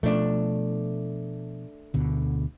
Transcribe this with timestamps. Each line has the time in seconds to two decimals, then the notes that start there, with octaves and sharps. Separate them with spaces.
0.03 B2 F3 A3 D4
1.94 D2 B2 D3